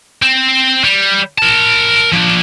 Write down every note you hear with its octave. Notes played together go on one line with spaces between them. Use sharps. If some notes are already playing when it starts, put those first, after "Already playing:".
C4
G3
A#4 A5
F3 D4